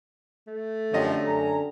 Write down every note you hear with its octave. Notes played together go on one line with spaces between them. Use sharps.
A3
F#2 D3 F3 C#4 G4 D#5
F#2 G#5 A#5